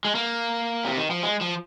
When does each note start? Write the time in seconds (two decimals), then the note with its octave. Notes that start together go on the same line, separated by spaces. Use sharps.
0.05 G#3
0.15 A#3
0.85 C3
0.97 D#3
1.11 F3
1.23 G#3
1.41 F3